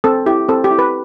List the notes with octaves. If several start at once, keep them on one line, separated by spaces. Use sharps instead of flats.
C4 A4
E4 G4
C4 A4
G4
E4
B4